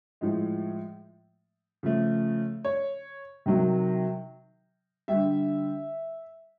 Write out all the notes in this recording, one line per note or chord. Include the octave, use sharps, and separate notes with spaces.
A2 F3 G#3
C#3 F3 A3
C#5
C3 D#3 F#3
D3 G3 E5